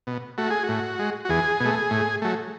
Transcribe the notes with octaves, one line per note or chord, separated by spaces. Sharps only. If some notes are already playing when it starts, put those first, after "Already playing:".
B2
A3 F#4
G#4
F#4
A2
G#3
F#4
E2 G#4
B2 A3
A2
F#3 A3